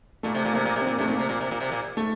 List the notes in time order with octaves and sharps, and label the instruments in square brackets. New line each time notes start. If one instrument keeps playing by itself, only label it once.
[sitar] A#2 [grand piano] A3
[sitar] C3
A#2
[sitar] C3 [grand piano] A#3
[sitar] A#2
C3
[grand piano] C4
[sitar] A#2 [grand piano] A#3
[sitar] C3 [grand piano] A3 C4
[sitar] A#2 [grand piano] A#3
[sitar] C3
A#2
C3
A#2
C3
A#2
[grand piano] A3